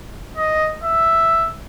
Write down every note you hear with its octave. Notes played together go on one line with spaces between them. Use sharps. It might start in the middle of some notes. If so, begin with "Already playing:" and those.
D#5
E5